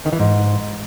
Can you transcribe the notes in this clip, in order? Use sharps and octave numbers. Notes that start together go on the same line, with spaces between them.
D#3
E3
G#2